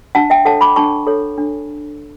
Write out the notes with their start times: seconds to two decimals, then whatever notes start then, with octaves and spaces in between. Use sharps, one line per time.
0.15 D4 F#5 A5
0.30 E5 G5
0.45 A4 C#5 F#5 A5
0.61 B5 D6
0.76 D4 A5 C#6
1.07 A4 C#5
1.38 D4